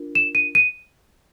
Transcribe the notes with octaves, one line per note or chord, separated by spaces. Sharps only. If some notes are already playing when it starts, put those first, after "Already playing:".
Already playing: D4 F4 A#4
E7
D#7
D#7